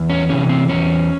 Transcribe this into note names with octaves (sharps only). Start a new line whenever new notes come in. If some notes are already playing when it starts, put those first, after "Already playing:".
Already playing: E2
C#4
C3 E3 C#4
C4
E2 C#4